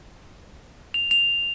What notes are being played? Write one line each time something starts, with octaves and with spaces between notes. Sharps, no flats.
F7
F7